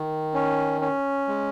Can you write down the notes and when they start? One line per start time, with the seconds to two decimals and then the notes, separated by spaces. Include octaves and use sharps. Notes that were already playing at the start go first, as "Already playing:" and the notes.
Already playing: D#3
0.34 C#4
0.81 C#4
1.28 G#3